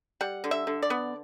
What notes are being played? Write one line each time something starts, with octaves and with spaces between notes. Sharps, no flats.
G3 F#5
D3
E5
D3
D5
B3